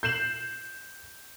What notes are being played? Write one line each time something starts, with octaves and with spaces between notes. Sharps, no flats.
G6 C7 E7 F#7